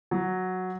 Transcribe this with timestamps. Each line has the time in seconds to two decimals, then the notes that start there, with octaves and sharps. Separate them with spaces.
0.11 F#3